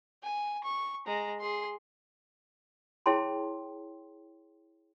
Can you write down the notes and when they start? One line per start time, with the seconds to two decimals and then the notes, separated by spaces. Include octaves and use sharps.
0.23 G#5
0.64 C#6
1.06 G#3 A#5
1.40 G#4 C6
3.06 E4 G#4 C#5 G5 A5 C6